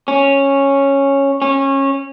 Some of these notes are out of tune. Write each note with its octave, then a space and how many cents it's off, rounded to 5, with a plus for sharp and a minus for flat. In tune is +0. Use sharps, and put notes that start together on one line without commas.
C#4 -5
C#4 -25